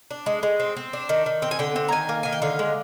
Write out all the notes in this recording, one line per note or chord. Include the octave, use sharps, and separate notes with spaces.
D4
G#3
G#3
C4
C4
D4
D#3
D#3
C4 G5
G#5
D3 G5
C4
A#5
D#3 G#5
A#3
D#3 G#5
G5
D3 F5
G#3